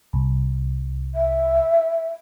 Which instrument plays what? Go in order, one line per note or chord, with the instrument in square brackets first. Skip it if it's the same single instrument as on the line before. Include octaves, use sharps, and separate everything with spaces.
[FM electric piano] C2
[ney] E5